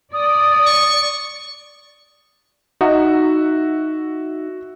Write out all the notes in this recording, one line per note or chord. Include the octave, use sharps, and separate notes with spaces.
D5 D#6
C#6
D#4 F#4 E5 F#5